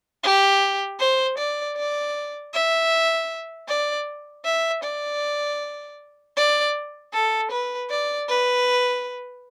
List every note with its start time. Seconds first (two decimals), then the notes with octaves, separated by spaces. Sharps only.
0.24 G4
1.00 C5
1.38 D5
1.77 D5
2.54 E5
3.68 D5
4.45 E5
4.83 D5
6.37 D5
7.13 A4
7.51 B4
7.90 D5
8.28 B4